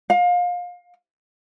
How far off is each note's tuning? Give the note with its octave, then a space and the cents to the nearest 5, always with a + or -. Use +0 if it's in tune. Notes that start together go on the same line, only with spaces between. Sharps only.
F5 +30